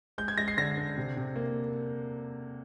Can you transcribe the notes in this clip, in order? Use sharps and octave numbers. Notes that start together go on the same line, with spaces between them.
G#3 G6
G#6
G#3 A#6
C7
D3 A#6
D3
C3
C3
A#3